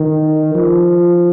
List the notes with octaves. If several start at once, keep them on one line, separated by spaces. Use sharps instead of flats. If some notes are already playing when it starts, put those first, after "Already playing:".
Already playing: D#3
F3